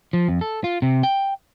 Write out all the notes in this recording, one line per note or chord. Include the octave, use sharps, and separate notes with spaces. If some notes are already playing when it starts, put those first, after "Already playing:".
F3
F2
A4
F4
C3
G5